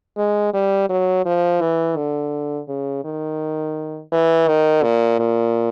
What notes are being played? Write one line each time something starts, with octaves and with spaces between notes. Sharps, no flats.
G#3
G3
F#3
F3
E3
D3
C#3
D#3
E3
D#3
A#2
A#2